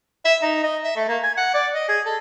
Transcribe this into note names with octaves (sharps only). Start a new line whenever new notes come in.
E5
D#4
D#5
E5
A3
A#3
G#5
F#5
D5
D#5
G#4
A4